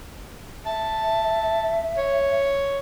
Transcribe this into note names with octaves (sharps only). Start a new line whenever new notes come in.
E5 A5
C#5